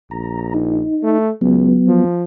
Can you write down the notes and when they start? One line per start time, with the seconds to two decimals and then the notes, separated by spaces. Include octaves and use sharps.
0.11 A#1 A#5
0.54 D#4
1.04 A3
1.41 C#2 F#3 B3
1.87 F3